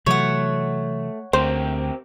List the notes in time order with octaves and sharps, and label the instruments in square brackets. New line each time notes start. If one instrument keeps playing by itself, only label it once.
[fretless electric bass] C3 E3 F#3 [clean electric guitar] A3 [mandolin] C#5 F#5
[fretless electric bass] D2 [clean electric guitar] C4 G4 A#4 [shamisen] C5